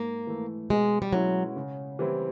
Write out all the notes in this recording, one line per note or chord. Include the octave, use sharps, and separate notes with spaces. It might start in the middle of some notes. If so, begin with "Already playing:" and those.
Already playing: G#2 A#3
E3 A3
B2 G#3
G3
F#3 G#3 C#4 E4
C#3
E3 G3 C4 E4